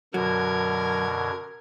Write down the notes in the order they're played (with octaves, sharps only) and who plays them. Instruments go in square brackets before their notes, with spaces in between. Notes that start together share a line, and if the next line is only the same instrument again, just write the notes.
[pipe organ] F#2 B2 D3 [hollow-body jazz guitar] F#3 [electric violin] A#4 G#6